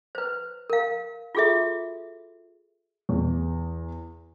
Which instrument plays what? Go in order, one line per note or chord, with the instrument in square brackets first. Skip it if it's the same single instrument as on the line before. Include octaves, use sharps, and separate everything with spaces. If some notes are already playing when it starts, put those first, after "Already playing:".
[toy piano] B4 C5
A#4 F5
F4 F#4 G#4 A4 E5
[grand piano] E2